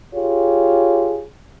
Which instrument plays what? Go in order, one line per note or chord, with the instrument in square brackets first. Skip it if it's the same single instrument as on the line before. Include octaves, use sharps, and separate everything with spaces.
[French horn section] F4 G4 G#4 C#5